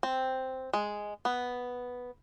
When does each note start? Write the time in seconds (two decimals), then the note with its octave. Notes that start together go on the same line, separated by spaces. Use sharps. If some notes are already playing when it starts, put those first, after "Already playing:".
0.03 C4
0.73 G#3
1.25 B3